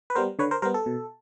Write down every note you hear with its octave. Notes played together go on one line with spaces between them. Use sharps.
B4
G3 B3 A#4 C5
D3 B4 C#5
A#4 C5
G3 B3 A#4 C5
A4
B2